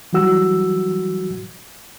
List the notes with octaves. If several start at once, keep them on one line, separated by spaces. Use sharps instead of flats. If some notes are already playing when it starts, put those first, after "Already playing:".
E3 F#3 G3 F#4 E6